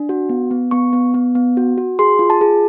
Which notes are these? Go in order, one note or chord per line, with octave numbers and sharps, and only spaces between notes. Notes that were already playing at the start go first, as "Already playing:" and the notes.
Already playing: D4
F#4
B3
B3
B3 C#6
B3
B3
B3
F#4
F#4
G#4 C6
F4
A5
G#4